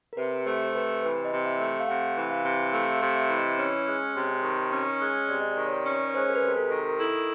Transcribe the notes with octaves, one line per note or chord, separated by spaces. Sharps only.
A#4
C3 B4
A3 C5
C3 B4
E3 B4
D#5
C3
E5
A3
F5
C3 F#5
E3
F5
C3
A3 F5
F5
C3
E5
E3
D#5
C#4 C#5
G#3
C3
D#3
C#4
G#3
C3 D5
D#5
D5
D#3
C#5
D5
C#4
C#5
G#3 C5
A#4
B4
C3
A#4
A4
D#3
A#4
E4 A4